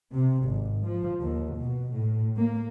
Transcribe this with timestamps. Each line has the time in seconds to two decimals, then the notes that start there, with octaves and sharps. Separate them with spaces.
0.14 C3
0.48 G#1
0.87 F3
1.21 D#2
1.60 B2
1.94 A2
2.39 A#3